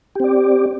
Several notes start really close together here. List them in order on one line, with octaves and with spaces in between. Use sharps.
G4 C4 D5